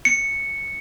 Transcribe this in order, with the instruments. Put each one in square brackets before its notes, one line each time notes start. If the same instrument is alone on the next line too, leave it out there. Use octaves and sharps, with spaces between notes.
[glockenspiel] C#7